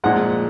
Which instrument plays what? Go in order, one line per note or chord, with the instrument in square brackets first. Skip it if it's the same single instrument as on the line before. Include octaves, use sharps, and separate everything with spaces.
[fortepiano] A#2 F3 G#3 F#5